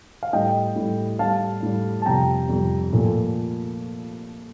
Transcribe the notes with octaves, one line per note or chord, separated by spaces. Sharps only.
F5
A2 G3 D#5 G5
A2 G3
A2 G3 F5 A5
A2 G3
A5
F2 C3 G3 G5 A#5
F2 C3 G3
A#2 F3 A3